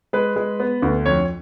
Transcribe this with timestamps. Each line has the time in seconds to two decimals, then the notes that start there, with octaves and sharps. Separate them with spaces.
0.13 G#3 B4
0.36 G#3
0.60 B3
0.82 D2
1.06 F2 C#5